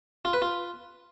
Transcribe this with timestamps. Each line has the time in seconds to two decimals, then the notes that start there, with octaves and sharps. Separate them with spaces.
0.25 F4
0.33 B4
0.42 F4